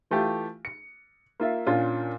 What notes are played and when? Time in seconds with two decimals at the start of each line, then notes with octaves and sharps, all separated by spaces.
0.11 E3 A3 F4 G4
0.65 C#7
1.40 A#3 F4 E5
1.67 A#2 C#4 D4 F4